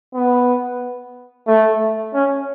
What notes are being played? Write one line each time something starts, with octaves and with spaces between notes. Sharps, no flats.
B3
A3
C#4